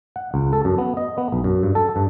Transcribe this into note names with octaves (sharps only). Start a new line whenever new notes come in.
F#5
C#2
A4
F#2
B3
D#5
B3
B1
F#2
G2
A4
G2